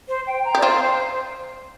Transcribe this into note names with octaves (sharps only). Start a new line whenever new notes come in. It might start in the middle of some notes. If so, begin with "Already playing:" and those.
C5
G5
A#5
G4
D5
C4 F4 C5